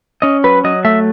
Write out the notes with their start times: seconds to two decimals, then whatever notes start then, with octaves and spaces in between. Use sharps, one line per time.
0.22 C#4 D#5
0.44 F#3 B4
0.64 F#3 D#5
0.85 A3 E5